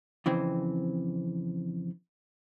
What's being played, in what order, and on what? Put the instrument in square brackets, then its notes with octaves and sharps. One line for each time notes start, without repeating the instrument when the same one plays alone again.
[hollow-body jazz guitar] F2 C#3 E3 C4